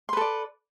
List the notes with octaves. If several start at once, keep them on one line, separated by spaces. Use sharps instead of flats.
A4 B4 D5 C6